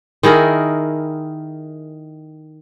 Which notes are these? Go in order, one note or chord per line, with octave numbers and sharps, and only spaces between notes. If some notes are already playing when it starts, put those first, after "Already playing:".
D#3 E4 G#4 A#4